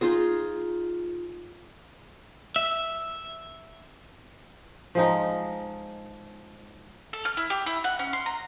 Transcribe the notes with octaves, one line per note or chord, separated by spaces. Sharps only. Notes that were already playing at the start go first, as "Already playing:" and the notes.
D#4 F4 G#4 D#5
E5
F3 G#3 D#4
A4
F6
E4
G4
E4
F#5
C#4
C6
A#5